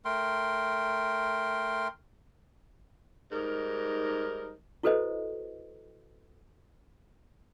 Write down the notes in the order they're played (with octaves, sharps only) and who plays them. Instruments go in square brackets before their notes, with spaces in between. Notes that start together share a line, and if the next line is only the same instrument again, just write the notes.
[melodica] A3 A#4 G5 C6
[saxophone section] G#2 G3 D#4 A#4
[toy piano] E4 F#4 A4 B4 C5 D#5